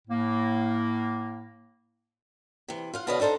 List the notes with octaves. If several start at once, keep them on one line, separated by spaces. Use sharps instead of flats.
A2 A#3
C3 E3
F4 F5 F#5
B2 D3 B4 C#5 D#5 F5
D4 D#4 A4 C5 A#5